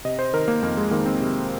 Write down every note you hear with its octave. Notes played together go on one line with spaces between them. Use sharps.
C3 D#5
C5
D#3 A#4
A#3
F2 A#3
G#3
D#3 A#3
C4
C3